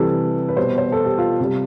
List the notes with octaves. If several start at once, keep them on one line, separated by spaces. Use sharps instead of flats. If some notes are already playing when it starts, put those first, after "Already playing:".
Already playing: C3 E3 G3 A4
B4
B2 G3 C5
C5
A4
G4
F4
C3 G3